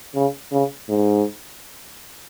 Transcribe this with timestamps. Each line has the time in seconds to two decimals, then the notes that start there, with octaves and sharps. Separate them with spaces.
0.15 C#3
0.52 C#3
0.89 G#2